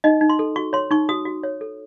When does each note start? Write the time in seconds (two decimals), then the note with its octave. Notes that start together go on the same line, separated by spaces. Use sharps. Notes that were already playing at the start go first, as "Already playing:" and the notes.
0.04 D#4 D#5
0.21 D#4
0.29 C6
0.39 A4
0.56 F#4 C#6
0.73 C#5 C6
0.91 D#4 C#6
1.09 F#4 D#6
1.25 F#4
1.43 C#5
1.61 A4